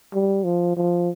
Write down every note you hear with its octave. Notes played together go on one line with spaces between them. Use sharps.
G3
F3
F3